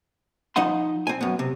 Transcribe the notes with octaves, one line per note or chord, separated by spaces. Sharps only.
F3 D#4 D#5 F#5 C6
C4 G#5
F#2 B3
C3